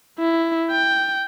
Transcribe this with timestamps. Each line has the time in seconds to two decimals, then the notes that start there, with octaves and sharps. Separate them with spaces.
0.19 E4
0.71 G5